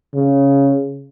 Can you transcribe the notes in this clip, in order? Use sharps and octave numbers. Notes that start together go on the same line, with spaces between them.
C#3